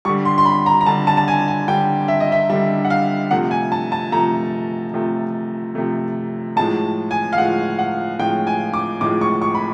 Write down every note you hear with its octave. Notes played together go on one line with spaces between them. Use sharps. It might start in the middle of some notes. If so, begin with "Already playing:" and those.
D3 G3 C#6
C6
C6
B5
A#5
A#5
D3 G3 A5
A5
A5
G#5
G#5
D3 G3 G5
E5
D#5
E5
D3 G3 E5
F#5
F5
C3 F3 A3 F#5
G#5
A5
A5
C3 F3 A3 A#5
C3 F3 A3
C3 F3 A3
A2 F3 G#3 A5
G#5
F5
A2 F3 G#3 F#5
F#5
A2 F3 G#3 G5
G#5
D6
A2 F3 G#3 D6
C#6
C#6
B5